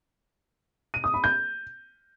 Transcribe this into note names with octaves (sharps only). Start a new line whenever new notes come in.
D#7
D#6
B5
G6